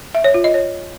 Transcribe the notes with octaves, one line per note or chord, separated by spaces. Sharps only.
E5
C#5
F4
D#5
C#5